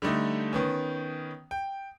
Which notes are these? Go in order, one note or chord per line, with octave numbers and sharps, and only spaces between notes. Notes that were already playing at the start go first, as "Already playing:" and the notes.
D3 G3 A3 D#4
D#3 B3 C#4
G5